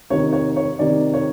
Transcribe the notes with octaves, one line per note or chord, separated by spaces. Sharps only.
C3 D#3 C#5
C#5
C#5
C3 D#3 D5
C#5